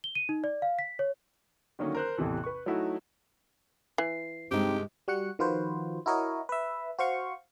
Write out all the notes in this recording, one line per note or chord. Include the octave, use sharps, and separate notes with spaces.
G7
D#7
D#4
D5
F5
B6
C#5
D3 D#3 F#3 A#3 C#4 D#4
A#4 C5 F#6
A1 E2 C3 E3 A4
B4 C#6
F#3 A3 D#4 E4 F#4
E3 C7
G2 C3 G#3 C4 D#4 G4
G3 F#4 F#5 C#7
D#3 F3 F4 F#4 B4 C5
E4 F#4 A#4 C#5 D#5
B4 E5
F#4 C5 F5 C#6